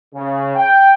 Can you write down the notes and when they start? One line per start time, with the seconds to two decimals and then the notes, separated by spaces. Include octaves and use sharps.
0.14 C#3
0.56 G5